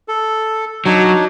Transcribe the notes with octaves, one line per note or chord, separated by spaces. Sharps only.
A4
F#3 D4 D#4 C#5